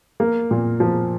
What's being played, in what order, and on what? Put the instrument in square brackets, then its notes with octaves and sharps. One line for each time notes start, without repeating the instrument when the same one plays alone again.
[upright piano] A#3
A#2
F3